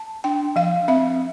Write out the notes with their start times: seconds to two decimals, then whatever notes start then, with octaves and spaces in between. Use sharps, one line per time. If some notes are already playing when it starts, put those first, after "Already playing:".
Already playing: A5
0.24 D4 G5
0.56 F3 F5
0.88 C4 E5